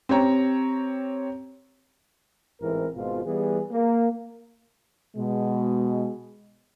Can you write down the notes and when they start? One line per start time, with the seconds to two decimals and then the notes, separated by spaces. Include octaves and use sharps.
0.09 C4 G4 C#5 A#5
2.61 A1 G#2 E3 C4 E4 A#4
2.94 G#1 G#2 B2 F4
3.25 E3 G3 B3 G#4
3.71 A#3
5.16 B2 G#3